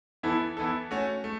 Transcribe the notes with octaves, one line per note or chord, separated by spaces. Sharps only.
E3 B3 E4 A4
E3 B3 E4 A4
A3 C#4 F#4
A3